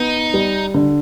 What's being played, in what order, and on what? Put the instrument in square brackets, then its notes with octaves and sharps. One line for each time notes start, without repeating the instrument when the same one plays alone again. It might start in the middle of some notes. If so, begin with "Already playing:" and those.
Already playing: [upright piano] B3 [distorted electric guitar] D#4
[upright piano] G3
D3